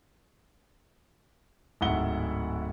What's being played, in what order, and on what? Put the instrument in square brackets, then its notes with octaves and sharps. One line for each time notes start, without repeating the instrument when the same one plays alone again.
[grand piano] D1 G#2 E4 F#5 G7